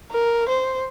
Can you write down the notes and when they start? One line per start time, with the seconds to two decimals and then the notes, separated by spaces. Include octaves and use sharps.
0.12 A#4
0.49 C5